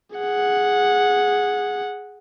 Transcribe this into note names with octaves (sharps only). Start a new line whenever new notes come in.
G#4 F#5